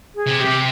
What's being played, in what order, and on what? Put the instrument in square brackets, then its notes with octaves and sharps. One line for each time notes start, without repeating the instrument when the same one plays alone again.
[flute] G#4
[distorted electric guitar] C3
[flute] G4
[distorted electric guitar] C3